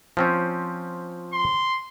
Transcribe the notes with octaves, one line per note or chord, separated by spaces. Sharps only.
F3 C4 C#4
C6